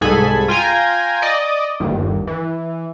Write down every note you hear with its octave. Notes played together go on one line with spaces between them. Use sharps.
C2 G#2 G#4 A4 G#5 B5
F4 G5 G#5 A#5
D5 D#5
G1 D#2
E3